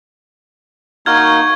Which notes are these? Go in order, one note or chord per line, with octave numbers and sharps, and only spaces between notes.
A#3 D#4 F#4 C#6 F6 G#6